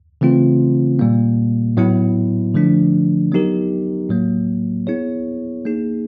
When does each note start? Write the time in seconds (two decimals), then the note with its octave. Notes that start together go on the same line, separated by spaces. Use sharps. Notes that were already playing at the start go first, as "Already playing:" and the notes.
0.21 C#3 E3 A3 C4 F4
0.99 A#2 G3 A#3
1.77 A2 F#3 B3 E4
2.54 D3 F3 A3 D4
3.32 F#3 B3 D#4 G4 A#4
4.09 A2 F#3 A#3
4.87 B3 E4 G#4 C#5
5.65 A#3 D#4 G#4